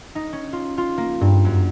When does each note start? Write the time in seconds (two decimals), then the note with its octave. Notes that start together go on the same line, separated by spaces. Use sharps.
0.15 D#4
0.33 C#4
0.53 F4
0.78 F4
0.98 A#3
1.21 G2
1.45 F#2